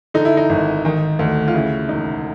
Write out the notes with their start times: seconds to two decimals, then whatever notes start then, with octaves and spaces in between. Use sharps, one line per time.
0.14 D3 D#4
0.25 E4
0.37 D#4
0.49 G#1
0.85 D#3
1.19 D2
1.48 F4
1.54 C#3 E4
1.89 E1 D#4